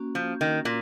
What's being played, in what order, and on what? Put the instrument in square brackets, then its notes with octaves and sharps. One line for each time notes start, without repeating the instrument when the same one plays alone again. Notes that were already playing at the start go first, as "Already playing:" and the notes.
Already playing: [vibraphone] A#3 C#4 F#4
[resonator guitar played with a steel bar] F3
D#3
A#2